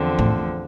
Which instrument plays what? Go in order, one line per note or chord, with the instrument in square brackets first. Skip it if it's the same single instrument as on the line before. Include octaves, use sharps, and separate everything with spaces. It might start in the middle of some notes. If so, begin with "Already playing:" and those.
Already playing: [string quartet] E2 D3 F3 C4
[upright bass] A2